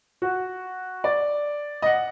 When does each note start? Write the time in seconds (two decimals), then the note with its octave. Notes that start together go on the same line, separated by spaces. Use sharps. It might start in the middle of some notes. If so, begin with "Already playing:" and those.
0.22 F#4
1.04 D5
1.82 D#5
1.86 F#5